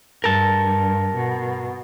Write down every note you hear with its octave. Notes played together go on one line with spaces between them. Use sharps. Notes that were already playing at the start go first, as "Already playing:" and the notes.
G2 A#4 A5
B2